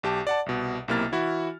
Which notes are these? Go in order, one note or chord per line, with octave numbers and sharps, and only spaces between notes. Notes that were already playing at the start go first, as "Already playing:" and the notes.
B1 G4 A5
D5 F#5 A5
C2 B2
B1 C3 A#3 E4 F6 A6
E3 E4 F#4